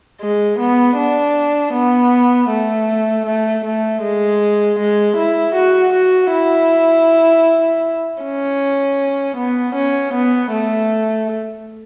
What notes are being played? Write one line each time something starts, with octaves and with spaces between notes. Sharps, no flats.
G#3
B3
D4
B3
A3
A3
A3
G#3
G#3
E4
F#4
F#4
E4
C#4
B3
C#4
B3
A3